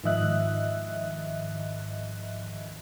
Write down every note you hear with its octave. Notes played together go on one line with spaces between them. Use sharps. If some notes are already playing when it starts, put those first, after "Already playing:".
G#2 D#3 F3 D#5 E5 F#6